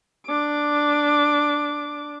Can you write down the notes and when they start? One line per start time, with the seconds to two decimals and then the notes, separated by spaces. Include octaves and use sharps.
0.26 D4 D6